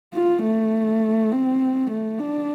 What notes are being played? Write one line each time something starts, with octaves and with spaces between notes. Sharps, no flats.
F4
A3
C4
A3
D4